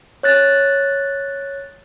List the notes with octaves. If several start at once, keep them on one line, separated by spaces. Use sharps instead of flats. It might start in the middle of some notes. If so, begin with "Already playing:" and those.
C#5 F#6 A6